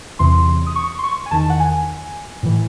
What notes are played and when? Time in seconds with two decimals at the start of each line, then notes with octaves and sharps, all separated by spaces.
0.19 E2 C3 E3 C6
0.66 D#6
0.76 C#6
0.99 C6
1.03 C#6
1.26 G#5
1.31 E2 D#3 A5
1.50 F#5
1.60 G#5
2.43 A2 E3